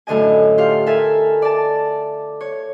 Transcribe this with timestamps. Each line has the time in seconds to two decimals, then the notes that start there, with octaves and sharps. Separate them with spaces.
0.07 F#2 A2 D3 D#5 G#5
0.58 F4 G4 F5
0.86 A4 A#4 E5 G#5
1.42 D5 A5
2.41 C#5